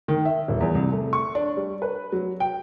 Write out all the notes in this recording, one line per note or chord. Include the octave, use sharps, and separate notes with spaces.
D#3
E5
D#1
E2
C2
A3
C#6
D4
G3
B4
F#3
G5